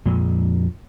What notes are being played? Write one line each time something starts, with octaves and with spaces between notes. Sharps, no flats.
A#1 F2 A#2 G#3